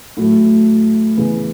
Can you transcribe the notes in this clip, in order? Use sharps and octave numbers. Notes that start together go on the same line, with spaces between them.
A2 F#3 A3
C#3 E3 B3